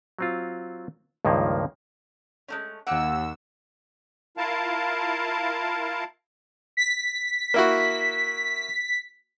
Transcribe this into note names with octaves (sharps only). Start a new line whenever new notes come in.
F#3 C4 F4
C#2 G2 D#3 F3 A#3
G#3 A3 C#4
D#2 A#3 F#5 E6
E4 F4 A#4 F5 A5
B6
A#3 E4 F#4